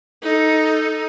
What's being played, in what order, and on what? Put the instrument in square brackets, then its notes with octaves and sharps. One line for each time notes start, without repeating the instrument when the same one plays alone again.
[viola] D#4 A4